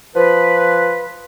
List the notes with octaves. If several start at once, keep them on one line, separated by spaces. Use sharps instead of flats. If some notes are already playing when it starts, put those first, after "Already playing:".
F3 B4